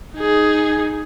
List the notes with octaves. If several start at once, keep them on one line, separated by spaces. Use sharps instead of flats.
D#4 G#4